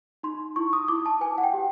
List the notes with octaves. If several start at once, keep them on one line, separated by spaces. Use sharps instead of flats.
D#4 C6
E4 C#6
D#6
E4 D6
A5
B4 G#5
F#5
G5
G4